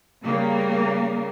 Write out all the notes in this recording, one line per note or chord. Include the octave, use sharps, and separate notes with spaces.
C#3 G3 A#3